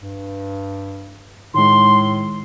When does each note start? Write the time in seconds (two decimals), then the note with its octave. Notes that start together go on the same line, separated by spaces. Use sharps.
0.02 G2
1.54 A2 D#3 G#3 C6